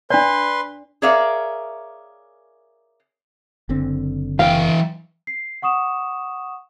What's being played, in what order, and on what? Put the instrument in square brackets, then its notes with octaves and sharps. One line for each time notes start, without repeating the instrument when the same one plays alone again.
[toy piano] D4 D5 [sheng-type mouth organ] B4 C6
[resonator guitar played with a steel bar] G#4 A#4 C#5 D5 E5 F5
[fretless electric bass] F#1 D3 C4
[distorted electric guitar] E3 G5 [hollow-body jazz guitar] F5
[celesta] C7
F#5 C#6 D#6 E7